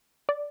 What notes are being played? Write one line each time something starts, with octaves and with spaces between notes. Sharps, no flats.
D5